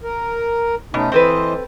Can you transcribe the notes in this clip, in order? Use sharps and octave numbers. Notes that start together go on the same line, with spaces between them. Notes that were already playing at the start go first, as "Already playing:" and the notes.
A#4
B2 A3 C#4 D#4
E3 C4 A4 B4 C5 D#5